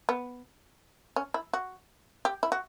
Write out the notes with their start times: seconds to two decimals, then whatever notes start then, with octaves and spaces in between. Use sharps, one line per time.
0.09 B3
1.16 C#4
1.34 E4
1.53 F#4
2.25 G4
2.43 E4
2.52 F#4